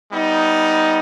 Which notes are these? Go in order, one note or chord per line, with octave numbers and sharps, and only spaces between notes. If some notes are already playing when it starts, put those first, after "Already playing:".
G3 B3 D#4